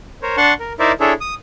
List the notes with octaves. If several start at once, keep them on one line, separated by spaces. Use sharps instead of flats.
A#4 C5 C#5
D4 F#5 A5 C6 C#6
A#4
D#4 E4 A#4 C5 D5 E5
D4 E4 G#4 A4 C#5 E5
D#6